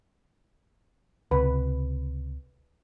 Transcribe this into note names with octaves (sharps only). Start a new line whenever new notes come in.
C#2 C3 B4